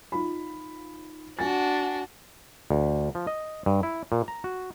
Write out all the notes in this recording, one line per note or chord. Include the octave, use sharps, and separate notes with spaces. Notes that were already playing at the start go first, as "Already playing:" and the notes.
D#4 F4 B5
D4 F#4 F#5 G#5 A6
D2
F3
D#5
G2
E4
A#2
A#5
F#4